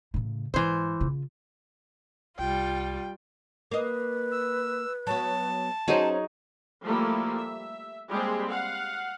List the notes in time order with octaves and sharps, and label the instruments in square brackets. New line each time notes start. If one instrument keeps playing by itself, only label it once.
[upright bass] A2 C#3
[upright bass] G#2 [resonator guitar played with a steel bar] E3 C5
[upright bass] C#3 F4
[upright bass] C2 [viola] G3 F4 [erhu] G5
[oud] A#3 D#5 [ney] B4
[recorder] E6
[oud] F#3 B3 [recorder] A5
[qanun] F#3 D#4 G#4 [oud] C#4 C5
[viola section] F3 G3 A3 A#3 E4
E5
G3 G#3 A#3 C4 G4 G#4
F5 F#5